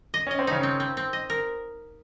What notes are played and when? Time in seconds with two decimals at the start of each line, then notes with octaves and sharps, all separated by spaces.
0.14 D#5
0.27 C#4 D#5
0.39 C4
0.47 C#3 C#4 D#4
0.63 C4
0.80 C4
0.97 C4
1.13 D#5
1.30 A#4